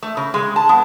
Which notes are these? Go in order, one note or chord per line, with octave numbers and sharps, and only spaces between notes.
A3
C#3
G#3
A5
B3